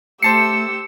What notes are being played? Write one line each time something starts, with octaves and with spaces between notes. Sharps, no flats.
A3 G4 C5 A5 E6 C7 C#7